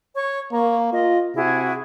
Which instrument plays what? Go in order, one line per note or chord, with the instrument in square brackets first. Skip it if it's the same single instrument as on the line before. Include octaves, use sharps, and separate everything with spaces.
[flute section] C#5 C#6
[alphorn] A#3 [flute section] A#5 C#6
[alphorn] F4 [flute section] D#5
[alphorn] C3 [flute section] E4 F#4 G#4